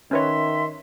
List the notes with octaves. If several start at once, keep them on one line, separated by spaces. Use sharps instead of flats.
D#3 C#4 B4 C#5 E5 C6